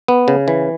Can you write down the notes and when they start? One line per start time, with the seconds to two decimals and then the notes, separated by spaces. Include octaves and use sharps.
0.08 B3
0.28 C#3
0.48 E3